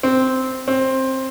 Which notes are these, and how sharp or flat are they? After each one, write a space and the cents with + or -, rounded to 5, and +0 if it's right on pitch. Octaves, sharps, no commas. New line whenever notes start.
C4 -5
C4 +15